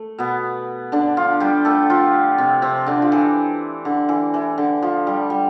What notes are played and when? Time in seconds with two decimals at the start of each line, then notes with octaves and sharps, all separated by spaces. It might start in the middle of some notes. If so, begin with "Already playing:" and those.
Already playing: A3
0.18 B2 B3
0.92 D3 D4
1.17 F3 F4
1.40 G3 G4
1.65 A3 A4
1.90 F3 F4
2.38 C3 C4
2.62 C3 C4
2.86 D3 D4
3.02 F3
3.12 E3
3.85 D3
4.09 E3
4.34 E3
4.58 D3
4.83 F3
5.07 G3
5.30 G3